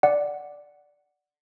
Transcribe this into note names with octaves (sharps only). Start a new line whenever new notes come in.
D5 F#5